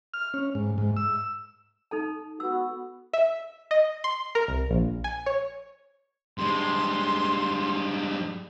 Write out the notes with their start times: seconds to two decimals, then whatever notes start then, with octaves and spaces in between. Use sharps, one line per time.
0.14 F6
0.34 C#4
0.55 G#2
0.78 G#2
0.97 E6
1.91 D#4 A4 A5
2.40 B3 F#4 E6
3.13 E5
3.71 D#5
4.04 C6
4.35 A#4
4.48 C2
4.71 A#1
5.04 G#5
5.26 C#5
6.38 G2 G#3 C6